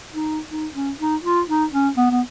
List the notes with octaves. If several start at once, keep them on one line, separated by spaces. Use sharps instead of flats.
D#4
D#4
C#4
D#4
F4
D#4
C#4
B3
B3